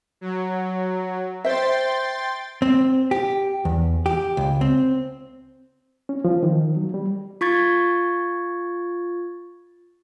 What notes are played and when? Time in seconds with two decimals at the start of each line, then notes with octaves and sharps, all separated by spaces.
0.21 F#3
1.45 C5 E5 G5 C6 A6
2.62 C4
3.11 G4
3.65 E2
4.06 G4
4.37 C#2
4.61 C4
6.09 C#4
6.25 F3
6.43 D#3
6.77 F#3
6.94 G3
7.41 F4 C#6 G#6 A6